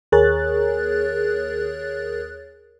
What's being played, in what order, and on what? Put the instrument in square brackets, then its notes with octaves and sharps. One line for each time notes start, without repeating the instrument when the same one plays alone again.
[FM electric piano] D#2 G#4 A#4 C#5 F#6 A6